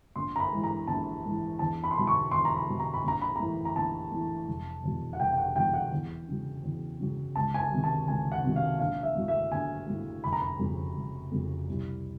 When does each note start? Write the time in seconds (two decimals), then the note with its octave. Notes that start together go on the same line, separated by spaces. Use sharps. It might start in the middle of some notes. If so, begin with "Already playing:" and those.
0.16 A#1 C6
0.36 A#5
0.40 B5
0.52 G#2 E3
0.64 A#5
0.87 A#1 A5
1.23 G#2 E3
1.59 E2 A5
1.84 B5
1.91 C6
1.96 B2 F#3 B5
2.07 C#6
2.31 E2 C6
2.45 A#5
2.55 B5
2.68 B2 F#3
2.79 A#5
2.94 B5
3.04 A#1 A#5
3.22 B5
3.36 A2 E3 A#5
3.65 A#5
3.76 A#1 A5
4.12 A2 E3
4.47 F1
4.83 E2 B2 F#3
5.13 F#5
5.20 F1 G5
5.33 G5
5.38 F#5
5.55 E2 B2 F#3 G5
5.74 F#5
5.92 E2
6.28 C#3 F#3
6.63 E2
7.00 C#3 F#3
7.36 C#2 A5
7.54 G#5
7.60 A5
7.72 C3 D#3 F#3
7.84 A5
8.07 C#2 G#5
8.32 F#5
8.44 C3 D#3 F#3
8.56 F5
8.79 A#1 F5
9.03 E5
9.15 A2 F#3
9.28 E5
9.52 A#1 G#5
9.88 A2 F#3
10.24 F1 B5
10.33 A#5
10.40 B5
10.59 F2 C#3 F#3
10.96 F1
11.32 F2 C#3 F#3
11.68 C2